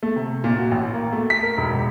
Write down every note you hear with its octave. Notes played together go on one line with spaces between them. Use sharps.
A3
C3
A#2
F#4
A1
A#3
A3
B6
A#4
E1
E1